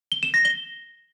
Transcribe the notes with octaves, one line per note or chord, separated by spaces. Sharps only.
G7
E7
A#6
G7